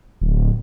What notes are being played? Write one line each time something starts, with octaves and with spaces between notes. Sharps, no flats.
D1